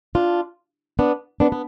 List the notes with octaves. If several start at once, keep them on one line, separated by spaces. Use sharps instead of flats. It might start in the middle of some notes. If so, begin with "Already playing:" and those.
D4 F4
B3 D4
B3 D4
B3